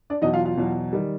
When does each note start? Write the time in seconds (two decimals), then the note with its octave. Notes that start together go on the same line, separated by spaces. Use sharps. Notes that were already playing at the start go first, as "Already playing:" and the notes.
0.10 D4 D5
0.22 E2 B2 F#3 D#4 D#5
0.34 F4 F5
0.45 F4 F5
0.57 E2 B2 F#3
0.93 D#3 G3